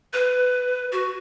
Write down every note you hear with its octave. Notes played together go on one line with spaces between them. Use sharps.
B4
F#4